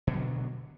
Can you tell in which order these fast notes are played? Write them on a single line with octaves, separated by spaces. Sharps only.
B2 D3 F#3